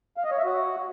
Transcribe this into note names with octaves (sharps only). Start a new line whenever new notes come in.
F5
D#5
C#5
E5
F#4